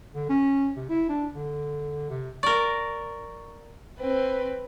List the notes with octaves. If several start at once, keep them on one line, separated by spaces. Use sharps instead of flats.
D3
C#4
C3
E4
D4
D3
C3
A#4 D5 C#6
C4 B4